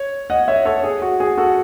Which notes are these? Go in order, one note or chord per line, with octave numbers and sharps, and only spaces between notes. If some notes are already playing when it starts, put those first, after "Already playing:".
Already playing: C#5
D#5 F#5
C#5 E5
A4 C#5
G#4
F#4
G#4
F#4 A4